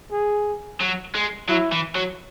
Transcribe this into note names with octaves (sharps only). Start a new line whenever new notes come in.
G#4
F#3
G#3
F#3 E4
E3
F#3